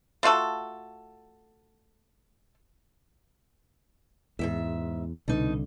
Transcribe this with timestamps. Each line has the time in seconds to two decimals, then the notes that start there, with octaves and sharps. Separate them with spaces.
0.23 A3 F4 F#4 A4
4.39 E2 G#2 D#3 E5
5.28 C2 B2 D3 D#4